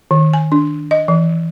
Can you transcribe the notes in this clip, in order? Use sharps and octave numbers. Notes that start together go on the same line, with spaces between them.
D#3
G#5
D4
D#5
E3